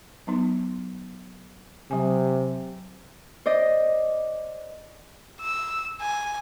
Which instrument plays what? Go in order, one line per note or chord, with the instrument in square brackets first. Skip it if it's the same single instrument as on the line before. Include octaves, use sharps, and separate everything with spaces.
[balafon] F#3 B3 D#4
[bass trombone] C3 [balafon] F#3 G#5
[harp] C5 D5 D#5
[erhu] E6
G#5